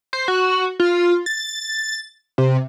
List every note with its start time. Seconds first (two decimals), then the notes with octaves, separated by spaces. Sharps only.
0.13 C5
0.28 F#4
0.80 F4
1.26 A6
2.38 C3